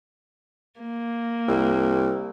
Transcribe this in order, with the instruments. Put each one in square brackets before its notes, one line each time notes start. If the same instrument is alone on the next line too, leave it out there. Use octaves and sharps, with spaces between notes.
[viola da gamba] A#3
[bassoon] C2